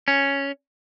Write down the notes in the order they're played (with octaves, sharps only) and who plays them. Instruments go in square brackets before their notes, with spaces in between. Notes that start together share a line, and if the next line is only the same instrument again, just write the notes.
[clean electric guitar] C#4